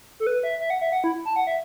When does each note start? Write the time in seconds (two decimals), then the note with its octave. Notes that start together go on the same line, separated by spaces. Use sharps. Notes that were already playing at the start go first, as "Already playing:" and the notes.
0.20 A4
0.27 B4
0.43 E5
0.60 E5
0.70 F#5
0.81 E5
0.92 F#5
1.04 E4
1.25 A5
1.36 F#5
1.47 E5